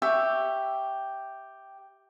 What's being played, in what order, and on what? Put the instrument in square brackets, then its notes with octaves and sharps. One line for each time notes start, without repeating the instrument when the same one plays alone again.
[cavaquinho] G4 E5 C#6